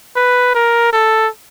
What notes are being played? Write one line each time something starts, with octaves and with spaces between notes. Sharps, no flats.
B4
A#4
A4